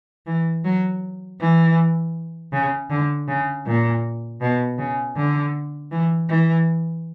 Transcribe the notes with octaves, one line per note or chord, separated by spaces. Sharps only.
E3
F#3
E3
C#3
D3
C#3
A#2
B2
C#3
D3
E3
E3